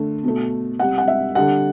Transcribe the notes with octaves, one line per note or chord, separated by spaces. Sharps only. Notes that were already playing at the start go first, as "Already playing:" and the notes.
Already playing: D3 A3
B2 A3
C3 G3 F#5
F#5
E5
D3 G3 F#5